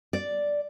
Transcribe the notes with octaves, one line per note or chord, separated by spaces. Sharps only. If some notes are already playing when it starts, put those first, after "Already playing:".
D5